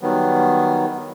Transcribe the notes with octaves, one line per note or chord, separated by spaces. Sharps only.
D#3 F#3 G3 B3